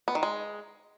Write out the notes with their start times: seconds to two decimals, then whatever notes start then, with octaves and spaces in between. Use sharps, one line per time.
0.08 B3
0.15 D#3
0.23 G#3